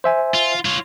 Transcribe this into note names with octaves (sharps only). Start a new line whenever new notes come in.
C5 E5 G#5
F4
F4 C#5